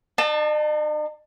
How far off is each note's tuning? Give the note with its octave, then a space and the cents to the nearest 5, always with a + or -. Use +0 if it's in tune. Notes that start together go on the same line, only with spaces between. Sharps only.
D#4 -45 A5 +15